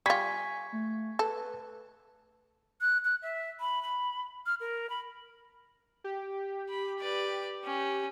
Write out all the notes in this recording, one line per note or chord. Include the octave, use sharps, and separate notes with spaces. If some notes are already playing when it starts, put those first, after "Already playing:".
G3 F4 G#5 C#6 G#6 B6
A3
A4 B4
F#6
F#6
E5
B5
B5
F6
A#4
B5
G4
B5
B4 D5
C#4